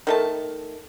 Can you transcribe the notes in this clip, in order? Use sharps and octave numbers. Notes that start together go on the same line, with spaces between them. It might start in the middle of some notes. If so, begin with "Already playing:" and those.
D#3 A3 A5